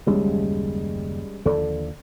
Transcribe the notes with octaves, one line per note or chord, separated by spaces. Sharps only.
F#1 D#2 G3 G#3 C#4
D#2 D3 F3 A4 D5